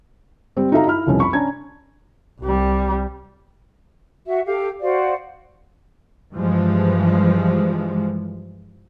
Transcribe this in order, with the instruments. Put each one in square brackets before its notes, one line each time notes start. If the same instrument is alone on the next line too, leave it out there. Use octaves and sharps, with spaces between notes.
[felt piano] G3 C4
D#4 F#4 A4 E5 F5 A#5
E4 B5 F6
F1 C2 C#4 F4
B5 C#6
C#4 D4 A#5 G#6
[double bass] C2 G3
[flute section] F#4 E5
G4 A4 F5
F#4 C5 D5 F5
[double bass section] G2 E3 F3 G#3